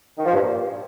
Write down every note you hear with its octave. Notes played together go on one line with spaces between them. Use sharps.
D#3
F3
G2
A#2